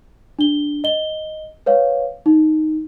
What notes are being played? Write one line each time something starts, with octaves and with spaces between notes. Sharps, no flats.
D4 G7
D#5 G7
B4 C#5 F5
D#4